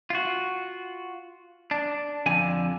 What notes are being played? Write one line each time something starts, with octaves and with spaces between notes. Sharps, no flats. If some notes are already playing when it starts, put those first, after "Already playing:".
F4 F#4
D4
F2 D3 G#5